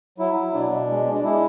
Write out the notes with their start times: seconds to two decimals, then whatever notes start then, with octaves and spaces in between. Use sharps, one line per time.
0.18 F#3 E4
0.37 F#3
0.54 B2 D4
0.71 B2
0.90 G#3
1.06 G#3
1.14 D4
1.23 G#3 E4